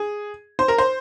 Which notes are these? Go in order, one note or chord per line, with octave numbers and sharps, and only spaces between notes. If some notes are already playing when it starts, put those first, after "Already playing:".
Already playing: G#4
C5
A#4
C5